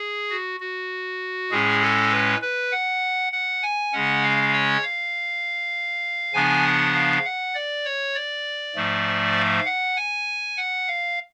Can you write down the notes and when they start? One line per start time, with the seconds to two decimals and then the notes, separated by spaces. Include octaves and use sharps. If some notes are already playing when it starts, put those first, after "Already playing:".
Already playing: G#4
0.30 F#4
0.60 F#4
1.51 A2 G#3 C#4 G#4
1.81 A4
2.11 B4
2.42 B4
2.72 F#5
3.32 F#5
3.63 G#5
3.92 C#3 G#3 C#4 F#5
4.23 F5
4.53 C#5
4.83 F5
6.34 C#3 F3 B3 D4 G#5
6.65 F#5
6.94 F5
7.25 F#5
7.55 D5
7.85 C#5
8.15 D5
8.75 G#2 F3 A3
9.36 F5
9.66 F#5
9.97 G#5
10.57 F#5
10.87 F5